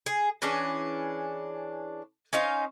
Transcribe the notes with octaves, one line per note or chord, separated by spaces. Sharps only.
G#4
E3 C#4 D4 G#4
C#4 D#4 C5 F5